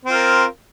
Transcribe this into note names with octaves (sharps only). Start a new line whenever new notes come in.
C4 F4 A#4